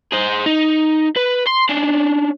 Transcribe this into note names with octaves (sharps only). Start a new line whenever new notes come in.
G#4 C5
D#4
B4
C6
C#4 D4